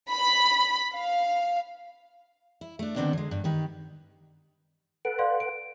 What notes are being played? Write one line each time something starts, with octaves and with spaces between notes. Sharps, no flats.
B5
F5
E4
A3 D4
D3 D#3 B3 C4 D4
D3 G#3
G2
D#3 G4 B4
A4 B4 F#5 D7
D5 F5 C6
D7